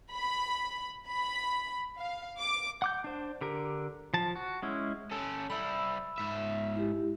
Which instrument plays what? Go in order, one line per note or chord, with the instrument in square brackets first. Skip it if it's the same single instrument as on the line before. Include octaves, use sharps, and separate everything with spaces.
[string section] B5
B5
F5
D6
[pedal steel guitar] F#5 D6 G6
D4 C5
D3 G4 A#4
F3 A5
F#4
G#3 C#4 E4
[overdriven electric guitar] C#4 A4
[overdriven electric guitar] G3 E4 [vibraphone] B5 E6
[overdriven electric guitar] G#2 E5
[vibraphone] E4 G4